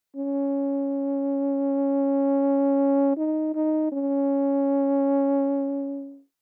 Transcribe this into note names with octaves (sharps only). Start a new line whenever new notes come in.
C#4
D#4
D#4
C#4